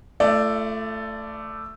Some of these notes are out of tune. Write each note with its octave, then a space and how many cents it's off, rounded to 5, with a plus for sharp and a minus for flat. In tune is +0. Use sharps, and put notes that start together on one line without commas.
A3 +5 F4 -45 D5 +0